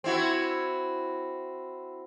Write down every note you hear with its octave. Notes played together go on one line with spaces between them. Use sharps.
C4 E4 F#4